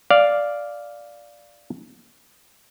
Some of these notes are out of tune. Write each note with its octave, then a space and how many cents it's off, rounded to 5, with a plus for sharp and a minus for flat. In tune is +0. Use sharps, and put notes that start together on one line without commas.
D5 +0 F5 +0